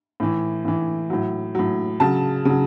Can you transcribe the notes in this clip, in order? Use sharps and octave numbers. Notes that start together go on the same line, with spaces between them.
A2 E3
A2 E3
A2 F#3
A2 F#3
C#3 F#3 A5
C#3 F#3